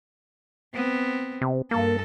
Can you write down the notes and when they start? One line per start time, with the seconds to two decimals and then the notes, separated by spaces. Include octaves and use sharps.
0.74 B3 C4
1.42 C3
1.71 G2 A#3 A4